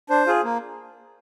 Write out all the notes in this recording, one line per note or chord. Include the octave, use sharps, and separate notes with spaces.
D4 C5
F4 G#4
A#3